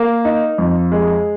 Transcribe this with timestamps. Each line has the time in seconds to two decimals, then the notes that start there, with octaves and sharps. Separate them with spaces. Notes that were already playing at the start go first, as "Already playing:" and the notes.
Already playing: A#3
0.25 D#4
0.58 F2
0.92 G#3